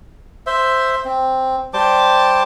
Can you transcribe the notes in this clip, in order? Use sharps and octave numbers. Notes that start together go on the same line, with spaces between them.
C5 E5
C4
G3 C5 A5 D6